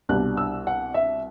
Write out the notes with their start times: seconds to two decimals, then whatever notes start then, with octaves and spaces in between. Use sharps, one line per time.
0.09 C2 B2 G3 D4 F#6
0.37 E6
0.67 F#5
0.94 E5